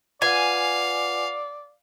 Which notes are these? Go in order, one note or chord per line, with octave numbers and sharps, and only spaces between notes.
F4 B4 D5 F5 F#5 G#5